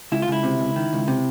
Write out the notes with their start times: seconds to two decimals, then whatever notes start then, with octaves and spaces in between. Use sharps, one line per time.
0.12 C#2 E4
0.22 F4
0.28 C#2 E4
0.43 C3
0.59 C#2
0.76 D#3
0.93 C#2
1.08 C3